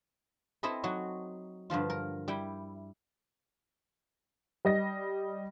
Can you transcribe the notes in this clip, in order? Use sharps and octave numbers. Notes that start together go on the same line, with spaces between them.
C4 E4 A4 C5 D#5 B5
F#3 D#4 F#4
G2 D3 F3 F4
A#4
G3 E4 G5
G3 D#5 A#6